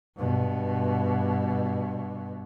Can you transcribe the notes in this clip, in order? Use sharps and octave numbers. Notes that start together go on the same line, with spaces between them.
G2 B2